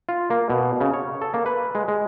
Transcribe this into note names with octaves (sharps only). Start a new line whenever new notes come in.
F4
A#3
B2
C#3
C#5
A4
A#3
B4
G#3
G#3